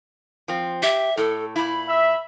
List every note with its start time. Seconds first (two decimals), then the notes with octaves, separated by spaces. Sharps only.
0.48 F3 C4
0.82 G4 E5
1.17 A2 A4
1.56 A#2 E4 B5
1.89 E5